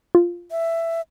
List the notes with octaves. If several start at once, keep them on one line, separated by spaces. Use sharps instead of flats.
F4
E5